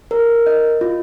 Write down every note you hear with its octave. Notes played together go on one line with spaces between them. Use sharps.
A#4
D#5
F4